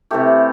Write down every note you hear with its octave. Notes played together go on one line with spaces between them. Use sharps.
C3 E3 A3 G4